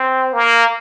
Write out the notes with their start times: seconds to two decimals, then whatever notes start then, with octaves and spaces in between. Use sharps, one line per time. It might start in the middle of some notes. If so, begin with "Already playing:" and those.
Already playing: C4
0.33 A#3